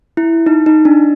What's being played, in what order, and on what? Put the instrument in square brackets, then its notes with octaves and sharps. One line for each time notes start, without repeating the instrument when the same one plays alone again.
[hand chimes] E4
D#4
D#4
D4